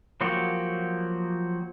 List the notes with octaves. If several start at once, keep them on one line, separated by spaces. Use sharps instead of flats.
F3 F#3 A#3 F#4 G4